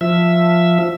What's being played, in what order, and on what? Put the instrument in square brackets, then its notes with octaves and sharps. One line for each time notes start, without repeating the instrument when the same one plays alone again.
[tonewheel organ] F3 E5